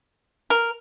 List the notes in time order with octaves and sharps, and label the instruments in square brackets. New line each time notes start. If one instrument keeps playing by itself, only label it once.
[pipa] A#4